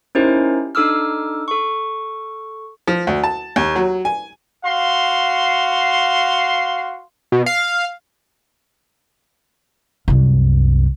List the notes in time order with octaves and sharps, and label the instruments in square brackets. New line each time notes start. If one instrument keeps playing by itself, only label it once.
[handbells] C#4 D#4 E4 G4 A#4 C5
D4 D#4 A4 D6 E6 F6
A4 C#6
[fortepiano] F3
D2
A5
D#2
F#3
G#5
[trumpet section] F#4 F5 C6
[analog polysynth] B2
F5
[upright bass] C2 F#2